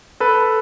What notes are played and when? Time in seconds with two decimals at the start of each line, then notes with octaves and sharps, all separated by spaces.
0.20 A4 B4